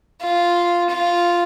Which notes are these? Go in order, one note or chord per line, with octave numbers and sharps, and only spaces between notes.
F4
F4